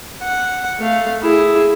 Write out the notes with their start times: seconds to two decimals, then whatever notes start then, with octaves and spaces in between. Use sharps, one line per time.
0.23 F#5
0.79 A3 F5
1.23 E4 G#4